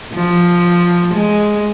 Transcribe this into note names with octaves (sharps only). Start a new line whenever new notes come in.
F3
G#3